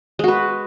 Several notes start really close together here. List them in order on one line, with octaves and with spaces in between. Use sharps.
G#3 F#4 B4